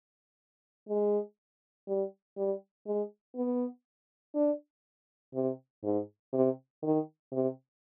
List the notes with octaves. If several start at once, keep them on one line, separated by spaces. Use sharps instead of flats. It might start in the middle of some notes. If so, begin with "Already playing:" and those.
G#3
G3
G3
G#3
B3
D4
C3
G#2
C3
D#3
C3